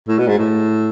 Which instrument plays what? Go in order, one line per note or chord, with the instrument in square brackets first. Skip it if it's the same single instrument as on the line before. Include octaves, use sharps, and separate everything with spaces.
[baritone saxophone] A2
B2
G#2
A2